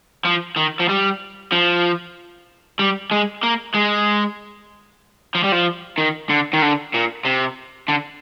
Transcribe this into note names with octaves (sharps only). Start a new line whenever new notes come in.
F3
D#3
F3
G3
F3
G3
G#3
A#3
G#3
F3
G3
F3
D#3
D3
D#3
D3
A#2
C3
D3